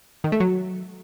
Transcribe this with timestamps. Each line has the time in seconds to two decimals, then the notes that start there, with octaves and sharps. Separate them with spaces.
0.24 D#3
0.32 A3
0.40 F#3